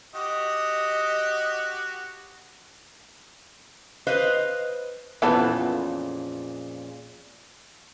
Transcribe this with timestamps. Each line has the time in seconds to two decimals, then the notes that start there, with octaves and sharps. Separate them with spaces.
0.15 F#4 G4 D#5
4.07 B4 C5 D#5 F5
5.22 F2 A#2 C#3 E3 B3 A4